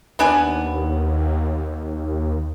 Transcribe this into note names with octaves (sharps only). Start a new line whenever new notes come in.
D#2 B3 D4 G#5